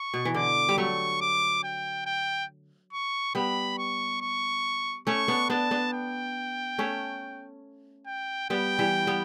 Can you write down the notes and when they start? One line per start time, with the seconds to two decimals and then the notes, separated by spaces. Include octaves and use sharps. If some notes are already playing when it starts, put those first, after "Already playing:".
Already playing: C#6
0.14 B2
0.25 E3
0.34 D3 D6
0.69 G3
0.78 F#3 A3 C#6
1.21 D6
1.64 G5
2.06 G5
2.93 C#6
3.35 G3 B3 B5
3.78 C#6
4.21 C#6
5.07 A3 C#4 C#6
5.28 B3 D4
5.50 B3 D4 A5
5.71 B3 D4
5.93 G5
6.79 A3 C#4
8.07 G5
8.50 G3 B3 G5
8.79 E3 G3
9.07 G3 B3